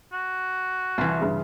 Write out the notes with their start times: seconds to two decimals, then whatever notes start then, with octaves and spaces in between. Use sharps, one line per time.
0.13 F#4
0.98 C2 E3 F4
1.21 G2 C#3